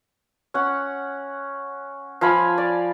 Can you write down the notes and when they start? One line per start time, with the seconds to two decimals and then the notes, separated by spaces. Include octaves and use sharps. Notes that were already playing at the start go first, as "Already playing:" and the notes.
0.54 C#4 F#5
2.21 F3 F5 G#5 B5
2.58 D5